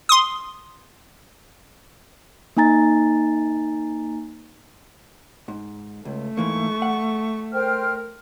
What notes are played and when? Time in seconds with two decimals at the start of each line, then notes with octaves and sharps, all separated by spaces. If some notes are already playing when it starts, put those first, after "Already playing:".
0.09 C6 D#6
2.57 A#3 D#4 G#5 A#5 A6
5.48 G#2
6.05 C#2 A3
6.37 G#2 E3 A#3 C#6
6.82 F#5
7.53 A#4 C5 G5 F6